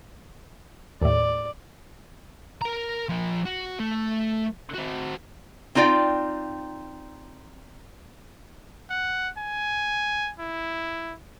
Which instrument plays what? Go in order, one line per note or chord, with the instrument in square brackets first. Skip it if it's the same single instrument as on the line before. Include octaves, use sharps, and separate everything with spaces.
[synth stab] D#2 A2 [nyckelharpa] D5
[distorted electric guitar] A#4 A#5
F3 A#4
F#4
A3
C4 F#4
[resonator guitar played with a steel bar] C4 D#4 F4 D5 G5
[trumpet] F#5
G#5
E4